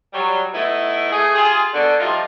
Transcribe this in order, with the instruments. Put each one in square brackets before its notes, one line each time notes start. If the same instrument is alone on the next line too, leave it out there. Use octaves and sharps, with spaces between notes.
[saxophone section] F#3 G3
A3 B3 D#4 E4
A3 G#4
F4 G4 G#4
B2 D3
F3 G3 A3 D#4 F4